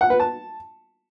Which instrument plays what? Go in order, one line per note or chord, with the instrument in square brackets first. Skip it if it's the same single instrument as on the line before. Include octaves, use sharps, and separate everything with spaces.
[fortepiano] F#5
B4
A5